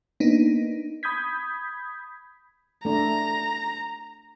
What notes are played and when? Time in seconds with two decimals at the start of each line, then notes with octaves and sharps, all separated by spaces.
0.20 A#3 B3 D4 D#4
1.03 B5 D#6 G6 G#6 B6
2.85 A3 D4 A#5